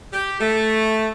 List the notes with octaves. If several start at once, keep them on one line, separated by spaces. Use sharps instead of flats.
G4
A3